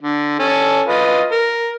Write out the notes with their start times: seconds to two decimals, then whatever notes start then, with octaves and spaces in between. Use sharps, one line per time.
0.02 D3
0.39 C#4 A4
0.88 F4 B4 D#5
1.32 A#4